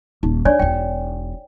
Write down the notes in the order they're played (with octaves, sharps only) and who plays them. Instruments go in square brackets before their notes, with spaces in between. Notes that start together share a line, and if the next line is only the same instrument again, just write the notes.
[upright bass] D#1 [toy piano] D#4
[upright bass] D4 [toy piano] C#5 D5 G#5
[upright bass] E1 E2 [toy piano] G5